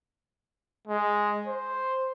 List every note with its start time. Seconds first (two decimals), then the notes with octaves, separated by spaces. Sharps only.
0.87 G#3
1.47 C5